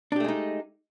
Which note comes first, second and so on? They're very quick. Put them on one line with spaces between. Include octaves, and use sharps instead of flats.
D4 G4 A3 G#3 D#4